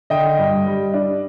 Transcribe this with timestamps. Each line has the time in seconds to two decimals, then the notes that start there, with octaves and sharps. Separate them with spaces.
0.10 D3 D#5 G5
0.39 G2
0.66 G3
0.94 D4